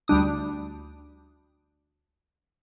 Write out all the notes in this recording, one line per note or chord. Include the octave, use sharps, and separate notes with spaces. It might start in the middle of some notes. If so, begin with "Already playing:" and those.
D2 G3 D4 D#6